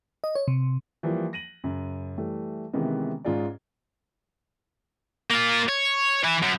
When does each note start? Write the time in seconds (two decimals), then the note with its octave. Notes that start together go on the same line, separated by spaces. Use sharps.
0.24 D#5
0.35 C#5
0.48 C3
1.03 E3 F3 G3 A#3
1.33 A#6 D#7 F#7
1.64 F#2 C#3
2.17 E3 G3 A3
2.73 C3 D#3 E3 G#3 B3 C#4
3.25 G#2 C#4 F4 G#4 D5
5.31 A#3 F4
5.69 C#5
6.24 E3 E4
6.43 F#2